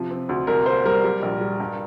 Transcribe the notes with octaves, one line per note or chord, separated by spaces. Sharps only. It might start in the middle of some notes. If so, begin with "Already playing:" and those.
Already playing: C3 F3
C4
D2
C2 A#4
A#3 C5
G3 A#4
G3
A#1
G3
G2